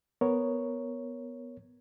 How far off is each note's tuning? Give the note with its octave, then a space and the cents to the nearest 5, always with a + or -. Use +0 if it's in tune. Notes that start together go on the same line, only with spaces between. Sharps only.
B3 +0 A#4 +0 C#5 +0